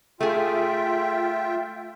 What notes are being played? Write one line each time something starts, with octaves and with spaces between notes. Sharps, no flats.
A3 F4 G#4 E5 G5